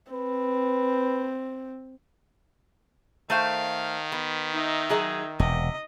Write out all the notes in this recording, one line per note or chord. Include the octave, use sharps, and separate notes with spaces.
C4 B4
D#3 A3 C5 F5 G5
B3
D#4 E5
F#3 G#4 D#5
E1 C3 D#5